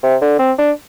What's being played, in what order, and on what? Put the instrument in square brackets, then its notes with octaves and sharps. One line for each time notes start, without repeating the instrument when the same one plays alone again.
[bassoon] C3
D3
C4
D4